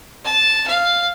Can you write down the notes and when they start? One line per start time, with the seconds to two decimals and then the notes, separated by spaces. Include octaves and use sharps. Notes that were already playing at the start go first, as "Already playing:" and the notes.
0.25 A5
0.68 F5